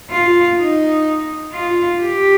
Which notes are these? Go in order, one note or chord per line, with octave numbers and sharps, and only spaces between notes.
F4
D#4
F4
G4